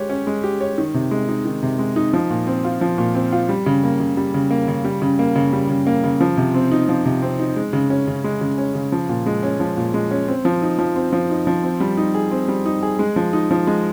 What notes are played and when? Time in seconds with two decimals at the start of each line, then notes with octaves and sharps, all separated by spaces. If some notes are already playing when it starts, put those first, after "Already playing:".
Already playing: G#3 G4 C#5
0.09 C#4
0.27 G#3
0.44 G4
0.61 C#5
0.78 D#3
0.94 C3
1.11 G#3
1.29 D#4
1.45 D#3
1.63 C3
1.79 G#3
1.96 D#4
2.13 F3
2.30 A#2
2.47 C4
2.64 F4
2.81 F3
2.98 A#2
3.15 C4
3.32 F4
3.49 G3
3.66 C#3
3.84 A#3
4.00 C#3
4.17 G3
4.34 C#3
4.51 A#3
4.68 C#3
4.84 G3
5.02 C#3
5.19 A#3
5.36 C#3
5.53 G3
5.69 C#3
5.87 A#3
6.04 C#3
6.20 F3
6.37 C3
6.54 C4
6.71 D#4
6.89 F3
7.05 C3
7.22 C4
7.39 D#4
7.56 G#3
7.73 C#3
7.90 C#4
8.07 C#3
8.24 G#3
8.41 C#3
8.58 C#4
8.75 C#3
8.92 F3
9.09 A#2
9.26 G#3
9.43 C#4
9.60 F3
9.77 A#2
9.94 G#3
10.11 C#4
10.28 C4
10.45 F3
10.62 D#4
10.78 F3
10.96 C4
11.12 F3
11.30 D#4
11.47 F3
11.63 C4
11.80 G3
11.97 D#4
12.14 G#4
12.32 C4
12.48 G3
12.66 D#4
12.83 G#4
12.99 G#3
13.16 F3
13.33 D#4
13.51 F3
13.67 G#3